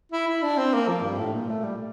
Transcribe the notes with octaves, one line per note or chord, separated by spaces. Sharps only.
E4
E4
D4
C4
A#3
F3
G2
A2
A#2
A3
G3